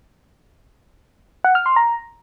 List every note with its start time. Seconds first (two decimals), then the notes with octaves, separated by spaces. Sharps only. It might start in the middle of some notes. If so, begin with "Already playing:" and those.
1.44 F#5
1.55 F6
1.66 C6
1.76 A#5